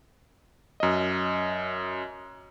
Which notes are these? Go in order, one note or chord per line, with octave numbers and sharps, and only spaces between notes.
F#2 D#5